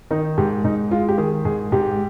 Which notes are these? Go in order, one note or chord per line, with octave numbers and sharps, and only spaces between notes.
D#3 D#4
G#2 G4
G#2 D#4
G#3 F4
G4
D#3 G#4
G#2 G#4
G#2 G4